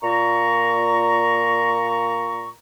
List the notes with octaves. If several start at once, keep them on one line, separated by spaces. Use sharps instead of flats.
A#2 A#5 C#6